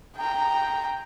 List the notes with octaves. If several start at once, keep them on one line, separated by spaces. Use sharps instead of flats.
G5 A#5